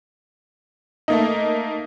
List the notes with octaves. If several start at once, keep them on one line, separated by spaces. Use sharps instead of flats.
A3 A#3 D#4